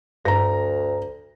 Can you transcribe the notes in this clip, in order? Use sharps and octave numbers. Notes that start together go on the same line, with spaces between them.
D2 G2 A#5 A#6